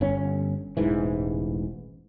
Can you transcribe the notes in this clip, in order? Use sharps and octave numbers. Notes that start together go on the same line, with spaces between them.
G1 C#4
E1 A1 G#2 E3